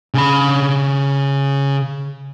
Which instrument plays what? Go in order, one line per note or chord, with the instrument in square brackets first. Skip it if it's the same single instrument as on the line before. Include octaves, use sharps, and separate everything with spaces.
[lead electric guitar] C#3 B5